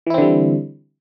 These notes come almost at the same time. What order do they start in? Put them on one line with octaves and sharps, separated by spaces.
E3 E4 C4 D3 G3